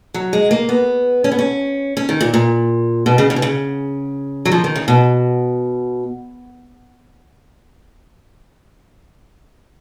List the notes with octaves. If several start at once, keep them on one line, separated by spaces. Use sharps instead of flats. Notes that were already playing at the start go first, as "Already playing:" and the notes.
F#3
G#3
A#3
B3
C#4
B3
C#4
C#4
D#3
A#2
A#2
B2
C#3
C#3
B2
C#3
F#3
F3
D#3
C#3
B2